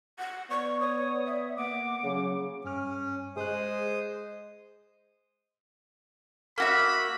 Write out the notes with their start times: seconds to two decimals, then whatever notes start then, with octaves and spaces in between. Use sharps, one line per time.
0.18 F#5
0.50 B3 D5 C#6
0.80 C#5 D#6
1.26 E5
1.57 A#3 F#5 D6
2.04 C#3 F#3
2.64 G2 C#4 F6
3.37 G#3 G#4 C5 D#6 F#6
6.58 A#3 F#4 E5 B5